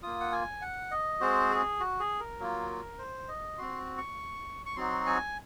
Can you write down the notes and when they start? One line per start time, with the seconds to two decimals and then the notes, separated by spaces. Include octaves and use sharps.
0.02 A#3 F4 D#6
0.20 F#5
0.32 G#5
0.62 F#5
0.91 D#5
1.21 G#3 C4 F#4 C5
1.51 G#4
1.80 F#4
2.00 G#4
2.20 A#4
2.39 F#3 A#3 F4
2.99 C5
3.28 D#5
3.58 C4 F#4 C6
3.98 C#6
4.66 C#6
4.76 F#3 C4 D#4 F#4 C6
5.06 G#5